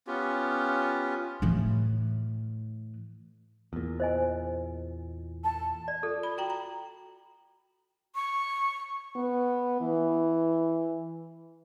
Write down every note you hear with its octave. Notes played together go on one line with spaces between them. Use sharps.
B3 C#4 F4 G4
A2 E3
E2 A#2
C5 D#5 G#5
A5
D5
F4 A4
B5
F#4 G5 A#5
A#5
C#6
B3
E3